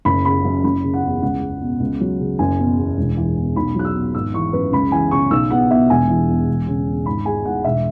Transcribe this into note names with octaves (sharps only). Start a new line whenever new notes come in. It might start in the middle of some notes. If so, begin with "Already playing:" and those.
F#1 B5
C#3 B5
F#2
F#1 B5
C#3
F#5
E2
C#2 F#5
G#3
B2
C#2
F#3
C#3
F#1 G#5
B2
E2
E1
E3
E2
B1 B5
F#3 F#6
E6
B2
G#1 E6
E3 C#6
F#2 B4
C#2 B5
E3 G#5
C#3 C#6
B1 E6
B3 F#5
B2 E5
E1 G#5
E3
E2
E1
C#3
E2
G#1 B5
G#3 G#5
G#2 F#5
E1 E5